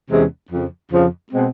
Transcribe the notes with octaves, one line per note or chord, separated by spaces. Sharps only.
E2 C3 E3 G#3 C#4
F2 C#3 F3
F2 C#3 F3
B2 G#3 C4